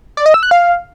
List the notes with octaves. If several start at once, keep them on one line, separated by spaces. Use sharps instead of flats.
D5
D#5
E6
F#6
F5